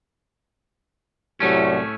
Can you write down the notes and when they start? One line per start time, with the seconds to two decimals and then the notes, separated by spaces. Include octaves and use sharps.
1.40 C2 A2 F#3 A3 C#4